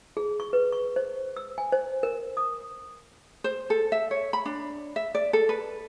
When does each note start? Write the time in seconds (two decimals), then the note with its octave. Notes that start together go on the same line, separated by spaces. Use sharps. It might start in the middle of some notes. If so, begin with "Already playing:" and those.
0.17 G#4
0.40 C#6
0.53 B4
0.72 C#6
0.96 C5
1.37 E6
1.58 G#5
1.72 C5
2.03 A#4
2.37 D#6
3.44 C5
3.70 A4
3.92 E5
4.11 C#5
4.33 B5
4.45 D4
4.96 E5
5.15 D5
5.33 A4
5.49 B4